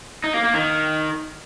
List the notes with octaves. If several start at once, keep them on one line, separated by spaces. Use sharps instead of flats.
D#4
A#3
A#3
D#3